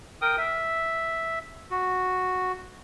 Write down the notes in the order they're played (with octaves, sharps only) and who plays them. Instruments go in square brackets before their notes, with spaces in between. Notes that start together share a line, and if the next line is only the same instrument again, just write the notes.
[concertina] A#4 G5 D#6
E5
F#4